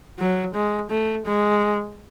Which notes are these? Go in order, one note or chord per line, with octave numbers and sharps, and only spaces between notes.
F#3
G#3
A3
G#3